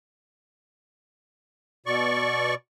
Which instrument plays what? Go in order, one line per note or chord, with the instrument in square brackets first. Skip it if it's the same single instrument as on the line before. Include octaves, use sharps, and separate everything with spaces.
[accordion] B2 D5 C#6